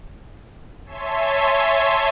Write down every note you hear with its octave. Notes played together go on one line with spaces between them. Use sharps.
C#5 E5 G#5 A5 C6